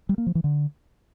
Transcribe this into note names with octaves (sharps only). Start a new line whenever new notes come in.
G3
A#3
F3
E3
D3